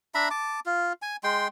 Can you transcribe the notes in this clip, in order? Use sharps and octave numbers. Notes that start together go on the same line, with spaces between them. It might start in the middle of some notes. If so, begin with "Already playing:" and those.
D4 E5 A#5 B5
A5 D6
F4
G#5
G#3 G5 C6